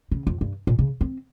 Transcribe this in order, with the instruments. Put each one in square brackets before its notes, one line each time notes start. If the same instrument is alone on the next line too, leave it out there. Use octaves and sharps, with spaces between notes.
[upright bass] C#3
F2
G2
A#2
C#3
C4